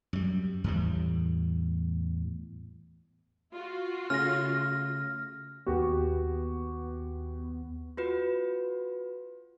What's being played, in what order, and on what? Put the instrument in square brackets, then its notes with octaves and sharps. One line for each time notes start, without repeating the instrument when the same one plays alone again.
[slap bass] F#2 G3
E2 A2 G3
[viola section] F4 F#4
[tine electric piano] C#3 A3 C#4 [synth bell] F6 A#6
[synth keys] D#2 B3 [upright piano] F#4 G4
[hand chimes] F4 F#4 B4